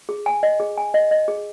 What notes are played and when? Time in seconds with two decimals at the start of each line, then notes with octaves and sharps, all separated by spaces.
0.09 G#4
0.26 G#5
0.43 D#5
0.60 G#4
0.78 G#5
0.94 D#5
1.11 D#5
1.28 G#4